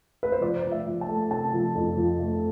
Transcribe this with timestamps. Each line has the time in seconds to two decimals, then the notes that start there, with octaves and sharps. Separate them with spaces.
0.23 B4
0.32 C5
0.41 F3 D5
0.64 F3
0.72 E5
0.86 F3
1.01 A5
1.09 A3
1.30 C3 A5
1.53 F3
1.75 F2
1.97 F3
2.20 A3